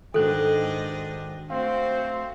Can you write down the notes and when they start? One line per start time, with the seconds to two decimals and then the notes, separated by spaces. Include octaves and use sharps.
0.14 G#2 D#3 D4 F#4 A4 D#5 G5 F#6
1.50 A3 C4 F#4 C5 F5